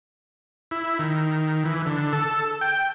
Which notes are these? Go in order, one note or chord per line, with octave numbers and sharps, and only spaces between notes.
E4
D#3
E3
D3
A4
G5